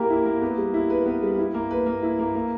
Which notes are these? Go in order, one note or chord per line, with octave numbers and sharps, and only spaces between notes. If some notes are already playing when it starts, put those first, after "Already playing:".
Already playing: A#3 E4 G4 A#4
E4
A#3
B3
G3
E4
B4
B3
G3
E4
A#3
B4
A#3
E4
A#3
A#3